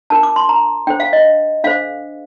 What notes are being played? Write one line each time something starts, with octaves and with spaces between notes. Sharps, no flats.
D4 F4 A#4 A5
D6
C6
A#5
D4 A4 C5 G5
F5
D#5
D4 A4 C5 F5